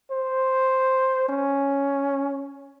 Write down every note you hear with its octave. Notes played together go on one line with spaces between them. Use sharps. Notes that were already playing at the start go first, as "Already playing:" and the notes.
C5
C#4